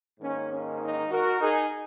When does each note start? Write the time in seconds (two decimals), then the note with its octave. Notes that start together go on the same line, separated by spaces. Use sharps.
0.20 G#2 D#3 A#3 C#4
0.50 C#4
0.80 D#4
1.10 F#4 A#4
1.41 D#4 G#4